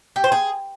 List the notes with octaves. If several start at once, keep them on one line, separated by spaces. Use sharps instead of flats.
G4
C5
G#4